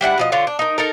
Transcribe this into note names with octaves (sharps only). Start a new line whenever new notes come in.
G3 D4 E4 F#5
B2 F3 D#5
D3 F4 C#5
D4
D#4 A#4
D#4 A4 A#4